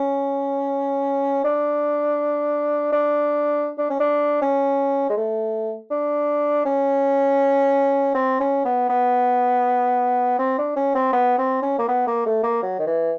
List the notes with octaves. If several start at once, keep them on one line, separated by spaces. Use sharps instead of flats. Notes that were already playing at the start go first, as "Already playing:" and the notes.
Already playing: C#4
D4
D4
D4
C#4
D4
C#4
G#3
A3
D4
C#4
C4
C#4
B3
B3
C4
D4
C#4
C4
B3
C4
C#4
A#3
B3
A#3
A3
A#3
F#3
D#3
E3